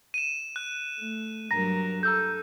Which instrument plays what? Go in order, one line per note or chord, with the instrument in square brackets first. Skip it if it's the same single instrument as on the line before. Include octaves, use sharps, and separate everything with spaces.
[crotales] D#7 E7
F#6
[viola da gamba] A3
[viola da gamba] G2 F#3 A#4 [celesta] A#5 A#6
[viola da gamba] A4 [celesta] A#5 E6 G6